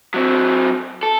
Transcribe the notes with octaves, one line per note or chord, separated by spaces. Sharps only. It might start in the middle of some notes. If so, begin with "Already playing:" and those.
F#3 C4
A4